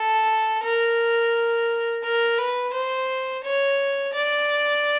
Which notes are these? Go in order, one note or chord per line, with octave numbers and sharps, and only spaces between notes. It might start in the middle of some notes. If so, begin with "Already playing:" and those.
Already playing: A4
A#4
A#4
B4
C5
C#5
D5